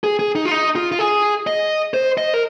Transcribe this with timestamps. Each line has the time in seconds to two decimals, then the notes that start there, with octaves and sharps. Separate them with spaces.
0.04 G#4
0.19 G#4
0.35 D#4
0.45 F4
0.51 D#4
0.75 F4
0.92 F4
0.99 G#4
1.47 D#5
1.94 C5
2.18 D#5
2.34 A#4